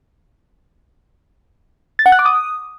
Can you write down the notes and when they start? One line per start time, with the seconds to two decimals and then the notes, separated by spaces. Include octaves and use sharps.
1.99 A6
2.06 F#5
2.12 F#6
2.19 D6
2.26 D#6